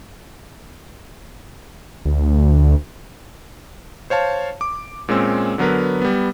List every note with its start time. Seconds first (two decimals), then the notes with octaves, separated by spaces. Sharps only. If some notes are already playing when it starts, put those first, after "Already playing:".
2.06 D2
4.10 C5 C#5 F5 A5
4.61 D6
5.09 A#2 G#3 C4 C#4 E6
5.58 D3 F#3 B3 A#4 B4
6.02 G3 B3